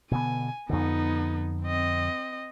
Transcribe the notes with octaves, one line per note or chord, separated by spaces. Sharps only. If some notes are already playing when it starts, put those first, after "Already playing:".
B2 D3 B3 G#5
F2 D3 B3 D#4
C4 D#5